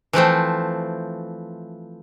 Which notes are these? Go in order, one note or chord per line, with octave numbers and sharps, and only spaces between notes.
E3 F3 A3 C4